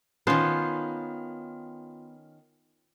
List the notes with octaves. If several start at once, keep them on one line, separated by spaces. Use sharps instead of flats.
D#3 B3 C#4 F4 C5